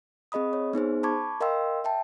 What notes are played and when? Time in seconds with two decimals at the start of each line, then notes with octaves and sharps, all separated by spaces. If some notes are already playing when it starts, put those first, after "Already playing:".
0.32 C4 G#4 D#5 B5 D#6
0.53 C#5
0.73 B3 D#4 G#4 C5
1.03 A5 B5 C#6 D6 G#6
1.41 A#4 D#5 F5 G5 C6 E6
1.84 E5 G5 A5